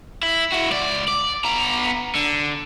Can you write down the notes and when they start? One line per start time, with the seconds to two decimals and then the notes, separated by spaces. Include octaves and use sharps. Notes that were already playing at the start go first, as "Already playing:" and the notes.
0.23 E4
0.53 E4 F#4
0.71 C#2 D5
1.08 D5
1.45 B3 A#5
2.15 D3